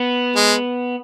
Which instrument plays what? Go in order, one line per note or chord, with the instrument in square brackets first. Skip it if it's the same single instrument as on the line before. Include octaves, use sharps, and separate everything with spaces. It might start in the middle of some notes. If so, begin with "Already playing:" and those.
Already playing: [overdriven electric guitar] B3
[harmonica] G#3